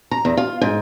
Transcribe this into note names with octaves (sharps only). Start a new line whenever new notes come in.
A#5
E2
F4
G#2